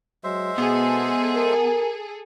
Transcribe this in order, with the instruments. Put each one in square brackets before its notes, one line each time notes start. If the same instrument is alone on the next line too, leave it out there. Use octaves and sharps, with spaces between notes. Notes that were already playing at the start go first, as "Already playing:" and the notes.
[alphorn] F#3 [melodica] G#3 C5 E5
[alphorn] B2 [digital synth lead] B3 [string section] G#4 A4
[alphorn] A#4